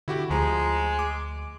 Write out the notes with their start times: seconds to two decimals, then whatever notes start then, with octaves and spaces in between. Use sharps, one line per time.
0.08 D3 E4 F#4 G4
0.30 D2 F3 G#3 A#5
0.99 D6